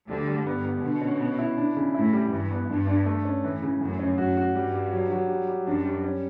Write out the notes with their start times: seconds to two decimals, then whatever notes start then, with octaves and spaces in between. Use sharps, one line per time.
0.08 D2 D3 G3
0.28 G3
0.46 G2 B3
0.65 B3
0.83 B2 D3
1.01 C#4
1.21 B3
1.39 E4
1.58 D4
1.76 C#3
1.94 A2 E4
2.13 G3
2.31 G2 E3
2.51 B3
2.69 G2 D4
2.87 D4
3.06 A3
3.25 C#4
3.44 A2 E3
3.62 C#3
3.80 F#2 A2
3.99 C#4
4.18 F#2 F#4
4.37 F#4
4.55 G2 G3
4.74 G3
4.93 F#3
5.12 F#3
5.29 G3
5.48 G3
5.66 F#2 D4
5.85 G3
6.04 C#4